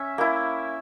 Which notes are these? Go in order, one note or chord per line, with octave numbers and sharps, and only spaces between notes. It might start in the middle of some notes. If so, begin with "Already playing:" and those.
Already playing: C#4 E5
A#3 E4